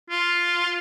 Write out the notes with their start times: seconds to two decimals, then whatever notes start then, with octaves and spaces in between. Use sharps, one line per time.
0.10 F4